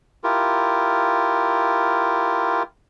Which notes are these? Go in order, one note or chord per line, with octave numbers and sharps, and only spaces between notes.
E4 F4 G4 A#4